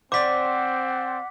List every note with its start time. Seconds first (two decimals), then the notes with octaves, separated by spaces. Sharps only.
0.12 C4 C5 D5 F#5 D6 B6